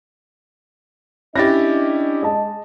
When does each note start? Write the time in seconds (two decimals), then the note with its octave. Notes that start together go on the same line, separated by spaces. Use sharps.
1.36 C#4 D4 E4 G4 D#5 A6 A#6
2.23 G#3 D#5 A5